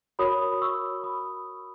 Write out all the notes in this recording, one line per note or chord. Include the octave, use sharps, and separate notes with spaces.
F#4 A#4 C#5 B5 D#6
C#6 E6
B5 D#6